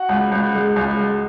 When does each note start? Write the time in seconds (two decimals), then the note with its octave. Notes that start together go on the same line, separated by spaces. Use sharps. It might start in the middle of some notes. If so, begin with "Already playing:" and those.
Already playing: F#4 F#5
0.09 C#2
0.32 C#2
0.55 G#3
0.76 C#2
1.00 G#3